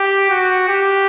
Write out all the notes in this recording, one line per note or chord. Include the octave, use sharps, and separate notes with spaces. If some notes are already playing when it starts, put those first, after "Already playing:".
Already playing: G4
F#4
G4